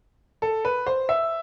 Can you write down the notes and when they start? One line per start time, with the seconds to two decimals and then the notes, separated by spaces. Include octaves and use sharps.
0.42 A4
0.65 B4
0.86 C5
1.09 E5